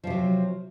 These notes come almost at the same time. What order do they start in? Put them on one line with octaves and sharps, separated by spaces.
F3 C3 F#3